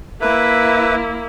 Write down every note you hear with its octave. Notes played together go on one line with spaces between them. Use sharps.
A#3 E4 B4 E5